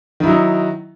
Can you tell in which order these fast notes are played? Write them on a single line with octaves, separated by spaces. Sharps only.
D#3 E4 F#3 D#4